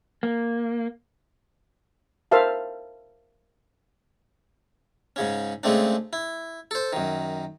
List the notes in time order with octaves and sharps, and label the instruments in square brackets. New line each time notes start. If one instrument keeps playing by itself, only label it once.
[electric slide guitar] A#3
[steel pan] A#4 C5 E5 F5 A5
[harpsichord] G#2 C#3 C#4
C#3 G#3 A3 C4 D4
E4
A4 C5
F#2 D#3